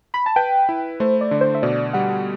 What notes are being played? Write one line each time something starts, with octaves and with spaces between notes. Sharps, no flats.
B5
A5
B4 G5
E4
A3 C5
D5
D3
C5
E5
B2 D5
G3 F#5